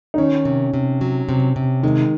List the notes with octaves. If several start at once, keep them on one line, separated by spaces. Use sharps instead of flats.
D#4
D#3 C#4
C3
C3
F#3
C3
C3
D#3 G#3